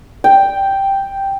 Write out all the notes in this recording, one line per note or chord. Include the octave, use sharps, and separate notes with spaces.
G5